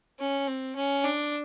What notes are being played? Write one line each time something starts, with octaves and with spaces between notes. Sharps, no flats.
C#4
C4
C#4
D4